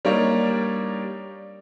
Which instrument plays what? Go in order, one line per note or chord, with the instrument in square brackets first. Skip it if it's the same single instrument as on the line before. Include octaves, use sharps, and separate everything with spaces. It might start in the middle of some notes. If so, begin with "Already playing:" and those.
[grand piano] G3 A#3 D4 D#4 C#5 D5